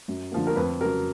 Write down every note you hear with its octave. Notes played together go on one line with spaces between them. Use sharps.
F#2
D3 F3 A#3
A#4
F2 B4
C#3 F#3 A#4